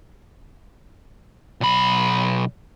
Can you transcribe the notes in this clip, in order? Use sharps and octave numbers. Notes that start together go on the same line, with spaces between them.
B1 B5